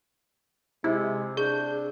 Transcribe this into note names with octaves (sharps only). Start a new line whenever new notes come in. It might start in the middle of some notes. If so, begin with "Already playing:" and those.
C3 G#3 E4
D4 G#4 G6